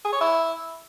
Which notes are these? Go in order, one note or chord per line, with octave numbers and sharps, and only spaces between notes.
G#4
C#5
E4